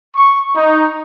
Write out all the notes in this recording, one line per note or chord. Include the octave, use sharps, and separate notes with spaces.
C#6
D#4